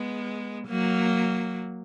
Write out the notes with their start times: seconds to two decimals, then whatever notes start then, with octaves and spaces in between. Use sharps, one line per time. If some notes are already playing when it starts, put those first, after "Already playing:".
Already playing: G#3 B3
0.67 F#3 A#3